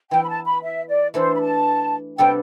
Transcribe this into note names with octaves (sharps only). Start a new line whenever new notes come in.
E3 B3 E4 G5
B5
A5
B5
E5
D5
E3 A3 D4 A4 C5
B5
A5
C3 G3 B3 D4 A4 G5